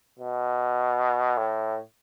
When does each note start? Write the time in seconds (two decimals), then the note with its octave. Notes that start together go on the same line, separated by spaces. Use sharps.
0.19 B2
1.37 A2